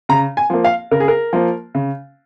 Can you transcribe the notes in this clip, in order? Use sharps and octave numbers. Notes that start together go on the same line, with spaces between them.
C#3 A#5
G#5
F3 A#3
F5
C#3 A#4
G#4
A#4
F3 A#3
C#3